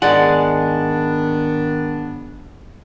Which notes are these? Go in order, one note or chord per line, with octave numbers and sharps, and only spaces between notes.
G#2 D#3 G#3 B3 D4 D5 F#5